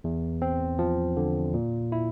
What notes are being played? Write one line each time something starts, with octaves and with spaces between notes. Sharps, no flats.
E2
C4
F3
D3
A#2
E4